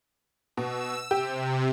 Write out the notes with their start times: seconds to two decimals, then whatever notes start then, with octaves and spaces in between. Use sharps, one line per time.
0.57 B2 E6
1.11 C3 G4